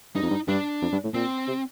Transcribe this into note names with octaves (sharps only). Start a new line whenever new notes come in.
G2 D#4
F2
G2
G2 D4
F2
G2
A2
A#2 C4
C3